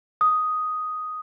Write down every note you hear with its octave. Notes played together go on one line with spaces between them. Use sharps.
D#6